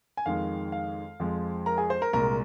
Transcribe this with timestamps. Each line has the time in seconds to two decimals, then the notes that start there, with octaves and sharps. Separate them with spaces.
0.17 G#5
0.26 F2 D#3 G#3 F5
0.72 F5
1.20 F2 F3 G#3
1.66 A#4 A#5
1.77 G#4 G#5
1.90 C5 C6
2.02 A#4 A#5
2.13 C2 A#2 G#3 A#4 A#5